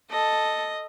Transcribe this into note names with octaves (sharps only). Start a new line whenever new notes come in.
A4 D#5